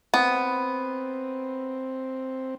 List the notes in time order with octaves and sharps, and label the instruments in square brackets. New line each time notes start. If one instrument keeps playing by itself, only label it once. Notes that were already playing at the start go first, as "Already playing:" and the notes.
[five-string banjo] B3 [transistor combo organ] C4